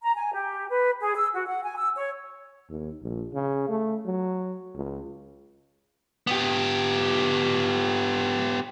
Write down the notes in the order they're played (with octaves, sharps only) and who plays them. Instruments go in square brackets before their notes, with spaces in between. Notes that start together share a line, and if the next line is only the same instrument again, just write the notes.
[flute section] A#5
G#5
G4
B4
G#4
E6
F#4
F#5
G#5
E6
C#5
[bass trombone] D#2
A#1
C#3
A3
F#3
C#2
[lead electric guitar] B3 G4